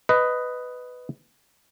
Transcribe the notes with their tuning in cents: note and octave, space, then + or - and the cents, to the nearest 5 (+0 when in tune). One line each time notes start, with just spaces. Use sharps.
B4 +10 D#5 +0